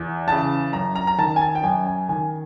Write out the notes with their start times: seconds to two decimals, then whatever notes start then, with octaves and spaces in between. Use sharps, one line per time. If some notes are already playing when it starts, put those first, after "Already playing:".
Already playing: E2
0.27 C#3 E3 A5
0.73 F#2 A#5
0.95 A#5
1.07 A#5
1.18 D#3 A5
1.36 G#5
1.41 A5
1.55 G5
1.63 F#2 G#5
1.86 G#5
2.09 D#3 G#5